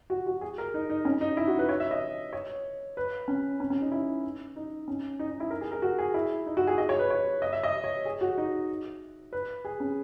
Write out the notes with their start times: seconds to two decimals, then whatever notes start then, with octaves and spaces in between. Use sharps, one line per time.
0.10 F#4
0.26 F#4
0.41 G#4
0.58 A#4
0.74 D#4
0.90 D#4
1.05 C#4
1.21 D#4
1.37 E4
1.47 F#4
1.59 B4
1.69 C#5
1.80 E5
1.91 D#5
2.33 C#5
2.97 B4
3.28 C#4
3.60 C#4
3.70 C#4
3.81 D#4
3.92 E4
4.56 D#4
4.88 C#4
5.19 D#4
5.30 D#4
5.40 E4
5.51 A#4
5.61 G#4
5.72 A#4
5.82 F#4
5.99 G#4
6.14 E4
6.46 D#4
6.57 F#4
6.67 G#4
6.78 D#5
6.89 C#5
6.99 B4
7.10 C#5
7.42 D#5
7.52 E5
7.63 D#5
7.84 C#5
8.05 G#4
8.21 F#4
8.38 D#4
9.33 B4
9.65 G#4
9.80 C#4